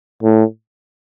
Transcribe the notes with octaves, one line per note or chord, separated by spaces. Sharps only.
A2